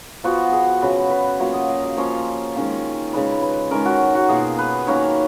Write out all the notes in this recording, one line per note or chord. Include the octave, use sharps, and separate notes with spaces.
F3 B3 F4 F#4
G#4
C#3 F#3 C#4 B4
B4
F#3 A#3 F4 C#5
D#5
F5
D#5
F3 A#3 C#4 F4 C#5
D#3 G#3 C#4 F4
C#3 G#3 D#4 B4
B4
D#3 G#3 C#4 A#4
F#4
F#4
B2 A#3 F4 G#4
B4
D#3 A#3 C#4 C#5